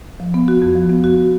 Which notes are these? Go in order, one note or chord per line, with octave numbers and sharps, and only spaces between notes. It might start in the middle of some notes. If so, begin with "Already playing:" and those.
F3
B3
F#4
F2
F3
B3
F#4